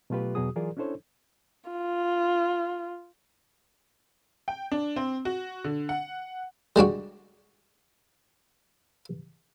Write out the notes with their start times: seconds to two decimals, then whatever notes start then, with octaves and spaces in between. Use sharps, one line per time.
0.10 B2 F#3 A3 F4 G4 B4
0.35 E2 B2 F#3 F#4 G#4 D#6
0.56 E3 F#3 F4 G#4 A#4 D5
0.77 C#4 D4 E4 A4 C5 C#5
1.70 F4
4.48 G5
4.72 D4
4.96 C4
5.25 F#4
5.64 D3
5.89 F#5
6.76 G3 G#3 D4 F#4